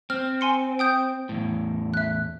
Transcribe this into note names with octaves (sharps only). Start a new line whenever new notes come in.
C4 F6
G#5 C6 C#7
G5 D#6 G6
E2 A2
E5 F#6